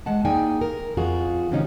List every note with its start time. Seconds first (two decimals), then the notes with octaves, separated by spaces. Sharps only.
0.06 G#3 F#5 A5
0.25 A#3 D#4 G#4 D5 G5 G#5
0.61 A#4
0.97 F2 F4 F#4 G#4
1.51 G#2 C3 D#3 F3 C#4 D#4